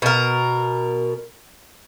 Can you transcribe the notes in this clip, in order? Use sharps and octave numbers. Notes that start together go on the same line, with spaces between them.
B2 A#4